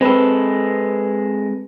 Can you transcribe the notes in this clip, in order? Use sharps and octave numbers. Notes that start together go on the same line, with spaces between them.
G#3 C4 A4 B4